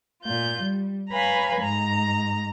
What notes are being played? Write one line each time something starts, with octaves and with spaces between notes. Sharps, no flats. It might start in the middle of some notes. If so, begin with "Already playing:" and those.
A#2 F4 G6
G3
B4 C#5 F5 G#5 A#5 B5
G#2 A#5